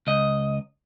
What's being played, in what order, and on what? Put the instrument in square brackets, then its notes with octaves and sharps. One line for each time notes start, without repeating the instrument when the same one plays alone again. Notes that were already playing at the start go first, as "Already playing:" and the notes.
[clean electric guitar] C#2 D#5